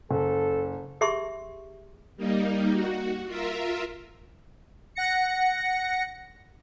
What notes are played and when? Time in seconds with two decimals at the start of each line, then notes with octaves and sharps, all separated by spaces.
0.11 F#1 A4
1.01 G4 G#4 E5 C6 C#6
2.17 G3 A#3 D#4
2.72 F#4
3.26 F4 A#4 E5
4.95 F#5 A#6 C#7